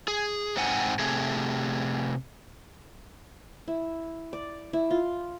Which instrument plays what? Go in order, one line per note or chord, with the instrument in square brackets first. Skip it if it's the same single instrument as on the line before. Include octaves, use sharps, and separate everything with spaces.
[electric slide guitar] G#4
G#2 C4 D#4 F#5 G#5
C3 A3 G#4
[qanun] E4
D5
E4
F4